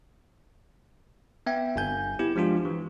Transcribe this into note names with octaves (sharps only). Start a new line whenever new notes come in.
B3 E5 G5
G1 G2 G#5 G6
B3 E4 G4
F3 G#3 D4 F4 G4
E3